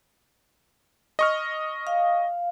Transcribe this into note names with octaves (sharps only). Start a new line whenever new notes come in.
D#5 C#6 F6
F5